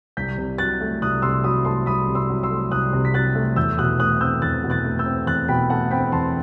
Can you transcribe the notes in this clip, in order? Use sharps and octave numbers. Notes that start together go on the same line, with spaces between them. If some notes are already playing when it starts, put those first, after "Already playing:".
C2 G6 B6
C3
F#3 F#6 A6
A3
C2 D#6 F#6
C3 C6 E6
F#3 B5 D#6
A3 A5 C6
C2 B5 D#6
C3
C6 E6
F#3
C6 E6
A3
C2 D#6 F#6
C3
B6
F#3 F#6 A6
A3
E2 E6 G6
B2 D#6 F#6
A3 D#6 F#6
C4 E6 G6
E2 F#6 A6
B2
F#6 A6
A3
E6 G6
C4
E2 F#6 A6
B2 G5 B5
A3 F#5 A5
C4 G5 B5
E2 A5 C6